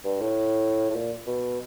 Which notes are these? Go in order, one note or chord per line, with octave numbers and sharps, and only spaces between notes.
G2
A2
A2
A#2
B2